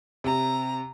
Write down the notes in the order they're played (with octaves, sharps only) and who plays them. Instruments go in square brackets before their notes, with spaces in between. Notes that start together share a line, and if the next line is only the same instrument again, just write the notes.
[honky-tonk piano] C3 [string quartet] A#5